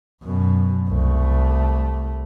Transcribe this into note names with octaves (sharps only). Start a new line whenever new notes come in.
F#2 B2
C2 A3